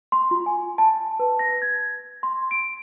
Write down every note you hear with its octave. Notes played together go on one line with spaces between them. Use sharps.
C6
F4
G#5
A5
B4
A#6
G#6
C6
D7